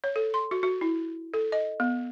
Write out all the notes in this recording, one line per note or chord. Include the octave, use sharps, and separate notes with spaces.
C#5
A4
C6
F#4
F#4
E4
A4
D#5
B3